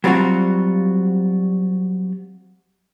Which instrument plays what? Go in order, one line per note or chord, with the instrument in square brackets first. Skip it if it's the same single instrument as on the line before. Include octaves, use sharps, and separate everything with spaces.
[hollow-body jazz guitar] F#3 G3 C4 F4 F#4